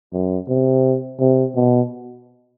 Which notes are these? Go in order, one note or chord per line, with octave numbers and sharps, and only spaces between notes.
F#2
C3
C3
B2